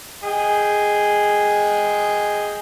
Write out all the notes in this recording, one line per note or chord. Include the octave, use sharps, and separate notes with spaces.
G#4 D#5 G5